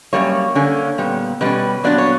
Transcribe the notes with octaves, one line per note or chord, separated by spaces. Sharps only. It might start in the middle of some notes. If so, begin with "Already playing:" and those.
F#2 C#3 G3 A#3 C#5
D3 A#3 C#4
A#2 G3 B3
B2 G3 C#4 B4
A#2 F#3 B3 D4 D5
C#5